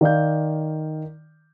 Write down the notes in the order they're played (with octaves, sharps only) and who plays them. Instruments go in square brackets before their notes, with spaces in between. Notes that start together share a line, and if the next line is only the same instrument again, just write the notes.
[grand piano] D#3 D5 F5 G6